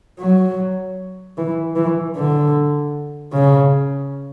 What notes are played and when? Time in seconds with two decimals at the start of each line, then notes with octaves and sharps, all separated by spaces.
0.19 F#3
1.37 E3
1.76 E3
2.16 D3
3.32 C#3